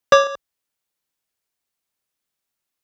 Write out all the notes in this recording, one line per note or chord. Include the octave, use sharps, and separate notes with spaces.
C#5 D6